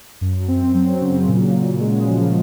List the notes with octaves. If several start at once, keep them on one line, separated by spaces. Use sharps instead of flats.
F#2
C4
F#3
C#3
A#2
A#2
G#3
F3